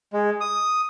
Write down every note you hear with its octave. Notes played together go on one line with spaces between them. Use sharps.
G#3
D#6